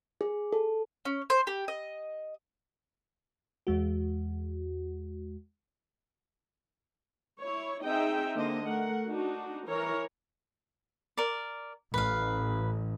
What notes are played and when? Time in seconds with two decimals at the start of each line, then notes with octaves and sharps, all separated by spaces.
0.21 G#4
0.53 A4
1.05 C#4
1.30 C5
1.47 G4
1.68 D#5
3.67 E2 G#3 F#4
7.40 E4 C#5
7.85 C4 D#4 G#4 D#5 E5 G5
8.36 D3 A#3 C5 D#5
8.65 A3 A#4 F#5
9.05 D4 D#4 F#4
9.68 E3 A#4 C#5
11.17 A#4 D5
11.94 A1 B4 F5